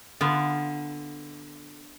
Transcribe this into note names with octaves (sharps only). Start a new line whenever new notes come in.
D3 B3 F4